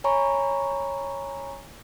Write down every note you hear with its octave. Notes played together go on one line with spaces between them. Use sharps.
C#5 G#5 A#5 B5 C#6